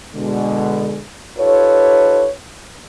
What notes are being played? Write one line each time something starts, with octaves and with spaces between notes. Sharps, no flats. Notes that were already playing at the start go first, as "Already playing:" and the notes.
B2 D3 G#3
D#4 F4 G4 A4 B4 C#5